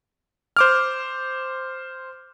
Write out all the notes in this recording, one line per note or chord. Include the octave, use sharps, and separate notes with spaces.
C5 D6 F6